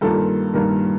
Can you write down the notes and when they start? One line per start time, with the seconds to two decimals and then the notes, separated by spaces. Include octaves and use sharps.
0.01 G2 D#3 A#3 F4 A4
0.54 G2 D#3 A#3